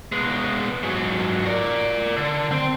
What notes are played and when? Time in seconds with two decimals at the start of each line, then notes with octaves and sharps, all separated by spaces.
0.12 G#3 B3
0.83 G#2 F#3
1.46 A#4 D5
2.17 D3
2.52 C4